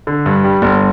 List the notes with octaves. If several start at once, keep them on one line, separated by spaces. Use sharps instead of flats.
D3
G2
G3
G1